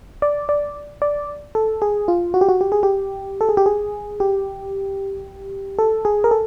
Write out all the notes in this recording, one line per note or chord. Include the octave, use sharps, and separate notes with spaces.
D5
D5
D5
A4
G#4
F4
F#4
G4
F#4
G4
G#4
G4
A4
G#4
G4
G#4
G4
A4
G#4
A#4
A4